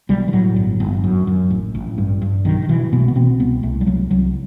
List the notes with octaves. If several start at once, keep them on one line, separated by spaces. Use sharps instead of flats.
B1 G3
E3
A2 F#3
G1
G1
F#2
F#2
A1
A1
G2
G2
B1 D#3
D#3
B2 E3
B2 B3
A3
B3
B2 C4
C2 B3
C2 A3
G3
C2 F#3
C2 F#3